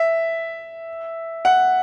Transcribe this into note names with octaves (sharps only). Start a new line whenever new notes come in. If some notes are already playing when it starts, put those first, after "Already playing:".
Already playing: E5
F#5